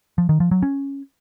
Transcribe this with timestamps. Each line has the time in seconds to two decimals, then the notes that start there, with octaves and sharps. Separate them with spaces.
0.18 F3
0.29 D#3
0.40 F3
0.51 F#3
0.63 C#4